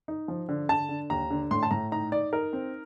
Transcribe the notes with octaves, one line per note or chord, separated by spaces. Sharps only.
D#4
F3
D3
D3 A5
D3
D#2 A#5
D3
A2 C6
A5
A2 A#5
D#4 A#5
D#4 D5
D#4 A#4
C4